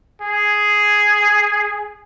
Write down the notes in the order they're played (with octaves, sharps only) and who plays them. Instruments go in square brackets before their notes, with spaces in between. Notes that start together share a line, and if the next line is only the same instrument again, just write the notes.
[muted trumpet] G#4